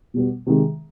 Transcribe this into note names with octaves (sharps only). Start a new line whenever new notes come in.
B2 G3 B3
C3 D#3 G#3